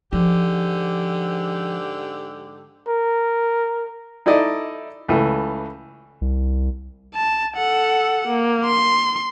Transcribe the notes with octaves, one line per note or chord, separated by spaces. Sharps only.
G#2 D3 F3 G4
A#4
D#4 E4 A4 D5 D#5
C#2 E3 A3
C2
A5
A4 F#5
A#3
C6